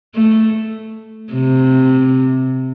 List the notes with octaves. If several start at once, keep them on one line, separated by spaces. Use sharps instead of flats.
A3
C3